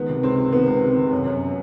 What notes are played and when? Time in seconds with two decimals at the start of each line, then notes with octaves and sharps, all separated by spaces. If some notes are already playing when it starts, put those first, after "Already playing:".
Already playing: C#2 D#3 B3
0.09 C3
0.23 C#2 C4
0.38 C#2
0.52 D#3 B3
0.67 C#2
0.82 C3
0.96 C3
1.11 F#2
1.26 F#2